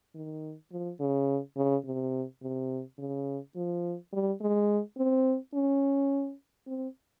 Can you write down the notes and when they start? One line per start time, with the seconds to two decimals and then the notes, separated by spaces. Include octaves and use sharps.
0.15 D#3
0.72 F3
1.00 C#3
1.57 C#3
1.85 C3
2.42 C3
2.99 C#3
3.56 F3
4.13 G3
4.41 G#3
4.97 C4
5.54 C#4
6.67 C4